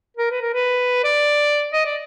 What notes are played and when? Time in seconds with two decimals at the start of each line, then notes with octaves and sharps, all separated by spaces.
0.17 A#4
0.31 B4
0.42 A#4
0.53 B4
1.04 D5
1.73 D#5
1.85 D5